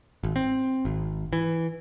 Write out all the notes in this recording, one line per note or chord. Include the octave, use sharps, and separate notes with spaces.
G#1
C4
G#1
E3